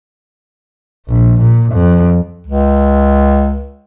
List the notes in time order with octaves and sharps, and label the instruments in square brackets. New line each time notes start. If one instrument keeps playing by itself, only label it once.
[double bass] A#1
A#2
F2
[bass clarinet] C#2